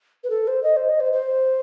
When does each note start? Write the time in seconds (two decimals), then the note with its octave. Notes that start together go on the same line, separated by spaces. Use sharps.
0.24 B4
0.30 A4
0.48 C5
0.63 D#5
0.76 C5
0.89 D#5
1.00 C5
1.13 C5